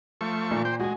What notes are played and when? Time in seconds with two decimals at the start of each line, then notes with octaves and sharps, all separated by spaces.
0.21 F3 A3 C#6
0.51 A#2
0.65 C5 G5
0.80 G#3 F#4 G#5